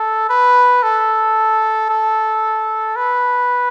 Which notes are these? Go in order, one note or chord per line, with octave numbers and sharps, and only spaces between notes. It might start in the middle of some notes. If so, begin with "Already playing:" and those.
Already playing: A4
B4
A4
A4
B4